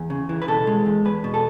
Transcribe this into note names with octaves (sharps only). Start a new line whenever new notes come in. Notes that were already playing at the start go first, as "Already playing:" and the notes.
Already playing: E2
C#3
E3
B4
B2 A4
G#3
E2
E2 B4
B2
A4